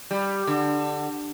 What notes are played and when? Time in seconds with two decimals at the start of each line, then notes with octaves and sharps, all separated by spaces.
0.11 G3
0.47 D3